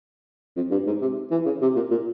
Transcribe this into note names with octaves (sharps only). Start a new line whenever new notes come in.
F2
G2
G#2
C3
E3
C#3
C3
A#2
A#2